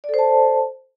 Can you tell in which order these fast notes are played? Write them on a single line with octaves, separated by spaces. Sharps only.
D5 A4 C5 A5